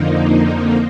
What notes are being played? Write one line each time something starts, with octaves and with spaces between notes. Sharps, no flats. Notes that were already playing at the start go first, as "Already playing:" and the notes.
Already playing: F2 D3 F3 A#3 D#4